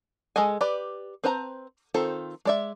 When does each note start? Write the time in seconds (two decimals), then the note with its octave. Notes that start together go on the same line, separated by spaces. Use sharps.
0.36 G#3 G#4 A4 D#5 G#5
0.61 G4 B4 D5
1.24 C4 B4 C5 A5 A#5
1.94 D#3 C4 F4 A4 C5
2.45 G#3 D5 E5